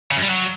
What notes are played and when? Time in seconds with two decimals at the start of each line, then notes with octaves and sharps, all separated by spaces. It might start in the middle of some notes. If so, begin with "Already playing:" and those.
0.11 C#3
0.17 F#2
0.22 G3
0.28 F#3